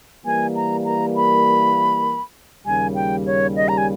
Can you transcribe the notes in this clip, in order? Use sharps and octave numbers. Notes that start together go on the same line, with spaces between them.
E3 G3 A#3 G#5
A#5
A#5
B5
D#2 C#3 G3 G#5
G5
C#5
D#5
A#5
G#5